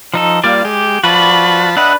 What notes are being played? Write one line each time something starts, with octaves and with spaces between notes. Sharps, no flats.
F3 D#4 A4
G3 A#3 F4 D5
G#3 G4
F3 F#4 B4 D5 A5 B5
D4 B4 D#5 E5 F#5